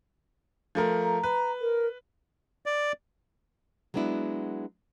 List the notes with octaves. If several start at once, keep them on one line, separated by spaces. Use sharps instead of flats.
F3 A3 A#4
A#5
B4
A#4
D5
F#3 G#3 B3 D4 E4